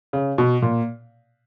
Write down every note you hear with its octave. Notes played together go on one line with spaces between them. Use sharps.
C#3
B2
A#2